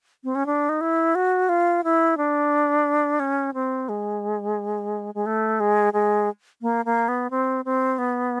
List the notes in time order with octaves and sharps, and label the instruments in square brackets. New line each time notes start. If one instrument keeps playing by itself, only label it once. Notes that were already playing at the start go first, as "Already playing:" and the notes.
[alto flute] C4
C#4
D4
D#4
E4
F#4
F4
E4
D4
C#4
C4
G#3
G#3
A3
G#3
G#3
A#3
A#3
B3
C4
C4
B3